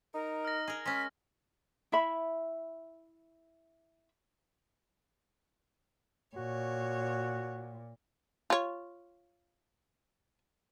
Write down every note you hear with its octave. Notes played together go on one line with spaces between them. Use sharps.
D#4 A#4
F6 A#6
G#4 A#4
G#3 C#4 B6
E4 E5 B5
A#2 F#4 C#5
F4 C#5